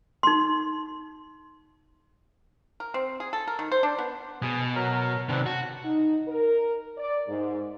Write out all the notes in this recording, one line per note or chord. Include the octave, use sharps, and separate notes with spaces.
D#4 C6
A#4
C4
G#4
A4
A#4
D#3
C5
D4
B3
B2 G#4
F#3 A#4
C3 D#3 C4 D4 B4
F#4 A5
D#4
A#4
D5
G#2